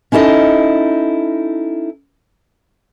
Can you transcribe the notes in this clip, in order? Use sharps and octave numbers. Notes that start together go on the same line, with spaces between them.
C#4 D#4 E4 A4 D#5